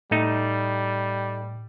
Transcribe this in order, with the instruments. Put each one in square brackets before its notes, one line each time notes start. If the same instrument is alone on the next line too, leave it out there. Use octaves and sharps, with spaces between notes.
[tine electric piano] A2 [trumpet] G3 [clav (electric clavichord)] A3 D#4